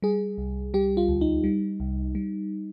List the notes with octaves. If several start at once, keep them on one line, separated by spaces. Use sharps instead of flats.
G3 G#4
C2
G3 G4
F4
D2
D#4
G3
C2
G3